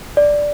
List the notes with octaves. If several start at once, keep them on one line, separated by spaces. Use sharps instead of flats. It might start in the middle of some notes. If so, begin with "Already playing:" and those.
D5